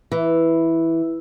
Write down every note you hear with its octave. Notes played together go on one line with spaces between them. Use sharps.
E3